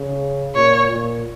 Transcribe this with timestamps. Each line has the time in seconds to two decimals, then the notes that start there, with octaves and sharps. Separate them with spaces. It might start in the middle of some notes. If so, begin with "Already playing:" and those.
Already playing: C#3
0.55 A#2 C#5
0.91 A#2